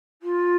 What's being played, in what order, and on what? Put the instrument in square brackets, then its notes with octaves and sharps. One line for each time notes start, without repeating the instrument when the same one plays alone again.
[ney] F4